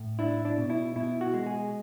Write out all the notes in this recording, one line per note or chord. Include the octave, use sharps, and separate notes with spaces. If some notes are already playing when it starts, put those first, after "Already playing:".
Already playing: A2
D4 E4
D4
B2
E4
B2 E4
F#4
G#3
G#4